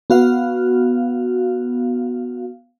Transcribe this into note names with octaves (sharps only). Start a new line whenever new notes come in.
B3 F#4 F5